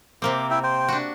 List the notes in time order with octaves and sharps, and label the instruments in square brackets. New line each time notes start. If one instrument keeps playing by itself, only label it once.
[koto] C3 A#3 C4 [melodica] D6
[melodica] E4 E5 G5
C5 G5
[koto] D4 F#4